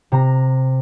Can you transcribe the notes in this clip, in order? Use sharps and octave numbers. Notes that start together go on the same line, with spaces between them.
C3 A#5